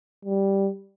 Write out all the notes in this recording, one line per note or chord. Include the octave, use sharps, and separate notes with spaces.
G3